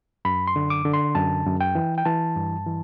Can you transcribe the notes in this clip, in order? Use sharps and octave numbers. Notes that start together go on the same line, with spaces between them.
F#2 B5
C6
D3
D6
D3
C6
F#2 A5
F#2
G5
E3
G5
E3 A5
G2
E3